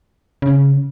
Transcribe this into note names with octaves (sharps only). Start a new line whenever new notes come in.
C#3